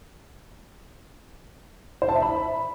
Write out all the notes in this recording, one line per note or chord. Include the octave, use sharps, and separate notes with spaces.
C5
A5
E5
B5